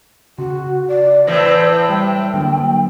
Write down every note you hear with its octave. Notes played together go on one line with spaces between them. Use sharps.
C#3 F#4
D5
A2 E3 C4 D5
G3 G5
D3 F#3 A#3